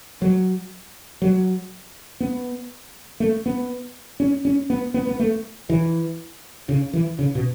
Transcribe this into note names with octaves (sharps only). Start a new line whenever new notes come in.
F#3
F#3
B3
A3
B3
C#4
C#4
B3
B3
B3
A3
E3
C#3
E3
C#3
B2